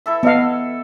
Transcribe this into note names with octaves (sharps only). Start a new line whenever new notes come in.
E4 A4 E5
B3 A4 D#5 F5